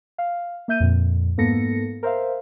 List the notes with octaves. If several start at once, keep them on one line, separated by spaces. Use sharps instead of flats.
F5
A#3 E5 G6 D#7
F2 A#2
G#2 A#3 B3 A4 A#6 C#7
A#4 C5 E5 F5